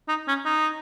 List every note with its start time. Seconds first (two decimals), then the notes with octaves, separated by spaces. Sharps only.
0.08 D#4
0.28 C#4
0.45 D#4